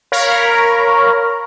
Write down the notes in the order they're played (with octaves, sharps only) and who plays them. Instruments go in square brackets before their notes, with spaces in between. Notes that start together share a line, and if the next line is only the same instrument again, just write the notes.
[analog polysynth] A#4 C#5 F5 A#5 B5